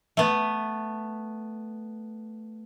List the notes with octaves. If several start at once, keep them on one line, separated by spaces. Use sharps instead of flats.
A3 B3